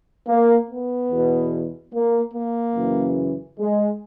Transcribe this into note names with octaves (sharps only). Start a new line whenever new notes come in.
A#3
B3
E2 B2
A#3
A#3
F#2 C#3 E3
G#3